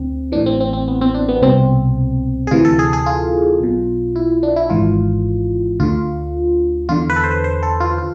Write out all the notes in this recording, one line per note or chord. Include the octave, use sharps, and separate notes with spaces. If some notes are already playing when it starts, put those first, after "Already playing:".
Already playing: D2 D3 C4
A1 A2 E3 D4
C4
C4
C4
B3
C4
D4
B3
C2 B2 C4
G#4
D2 C3 E3 F4
A4
G#4
G#4
F4
B1 B2
E4
D4
E4
G#1 G#2 E3 F4
D2 D3 F4
E2 D3 F4
B4
A4
C5
B4
C5
A4
F4
F4